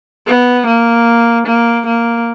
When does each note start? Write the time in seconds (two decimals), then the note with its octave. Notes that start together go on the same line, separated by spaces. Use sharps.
0.27 B3
0.66 A#3
1.46 A#3
1.86 A#3